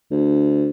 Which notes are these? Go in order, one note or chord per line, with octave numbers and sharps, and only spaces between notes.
D2